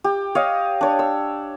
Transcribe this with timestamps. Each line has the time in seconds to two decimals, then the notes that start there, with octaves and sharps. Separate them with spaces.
0.04 G4
0.35 C#5 D#5 F5
0.81 D4 C#5
0.99 E6